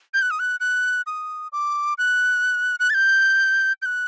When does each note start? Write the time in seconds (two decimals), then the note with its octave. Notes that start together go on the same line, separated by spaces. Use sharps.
0.14 G6
0.22 F#6
0.31 D#6
0.39 F#6
0.60 F#6
1.06 D#6
1.52 D6
1.98 F#6
2.80 F#6
2.90 A6
2.94 G6
3.82 G6
3.86 F#6